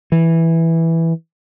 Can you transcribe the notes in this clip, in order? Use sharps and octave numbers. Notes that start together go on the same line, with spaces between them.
E3